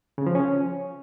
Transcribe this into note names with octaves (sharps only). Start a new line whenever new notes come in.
C#3
F3
C#4